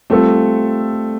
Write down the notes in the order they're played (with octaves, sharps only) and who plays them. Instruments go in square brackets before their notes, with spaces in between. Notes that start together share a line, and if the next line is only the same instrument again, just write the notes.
[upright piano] G3 C4 F4 A4 [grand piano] A3